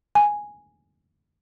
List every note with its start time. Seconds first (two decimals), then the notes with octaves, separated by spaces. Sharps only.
0.15 G#5